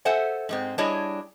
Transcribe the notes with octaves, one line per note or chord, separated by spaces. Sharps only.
A4 C5 E5 F#5 G#5
G#2 G#3 C4
G3 D4 E4 G#4 C#5 D#5